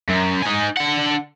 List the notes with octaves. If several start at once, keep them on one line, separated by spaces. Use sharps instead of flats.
F#2
D#4 G#5
D3 F#5